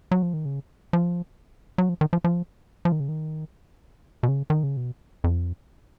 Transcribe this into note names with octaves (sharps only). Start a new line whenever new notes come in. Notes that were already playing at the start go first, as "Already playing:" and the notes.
F#3
F3
D#3
C#3
F3
F#3
F3
D#3
F3
F3
F3
D#3
C#3
D#3
B2
C#3
D#3
C#3
B2
F2